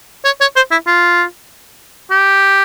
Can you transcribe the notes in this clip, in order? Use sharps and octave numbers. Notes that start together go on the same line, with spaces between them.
C#5
C#5
C5
E4
F4
G4